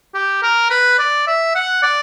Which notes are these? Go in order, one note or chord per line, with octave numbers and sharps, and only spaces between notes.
G4
A#4
B4
D5
E5
F#5
D5